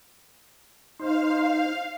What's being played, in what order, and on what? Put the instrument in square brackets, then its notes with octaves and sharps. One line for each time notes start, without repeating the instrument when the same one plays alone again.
[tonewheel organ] D#4 C5 [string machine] F5